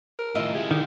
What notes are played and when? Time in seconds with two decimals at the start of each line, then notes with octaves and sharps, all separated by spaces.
0.19 A#4
0.35 A2 D#3 F4 D#5 E5
0.54 E4 G4 G#4
0.71 D3 D#3 G3